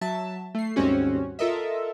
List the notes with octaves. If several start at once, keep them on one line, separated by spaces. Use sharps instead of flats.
F#3 E5 A5
A3 C7
D#2 G#2 G3 C4 C#4 F#4
F4 A4 A#4 D#5 E5